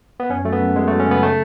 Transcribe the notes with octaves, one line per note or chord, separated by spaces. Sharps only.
B3
F#2 C#4
F#3 A3
B3
F#2
F#2 G#3
A3
F#3
C#4
C#3 B3
A3